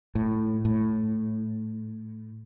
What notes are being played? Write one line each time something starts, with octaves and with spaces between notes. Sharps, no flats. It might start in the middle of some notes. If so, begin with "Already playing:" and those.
A2
A2